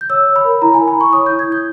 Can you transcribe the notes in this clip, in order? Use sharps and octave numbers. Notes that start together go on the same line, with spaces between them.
G6
C#5 E6
C#5
B5
A#4
E4 A#5
A#4 G#5
B5
E4
C#6
C#5 D#6
E4 G6
G#6
E4 G6